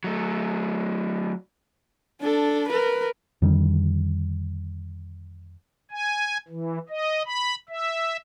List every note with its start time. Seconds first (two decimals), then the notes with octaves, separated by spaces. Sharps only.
0.04 F#3 A3
2.21 D4 A4
2.68 A#4 B4
3.42 F2 D3 D#3 G3
5.91 G#5
6.48 E3
6.89 D#5
7.25 B5
7.69 E5